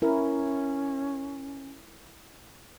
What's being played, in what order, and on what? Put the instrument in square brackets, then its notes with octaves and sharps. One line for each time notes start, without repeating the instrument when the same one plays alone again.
[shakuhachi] C#4 [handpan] E4 A#4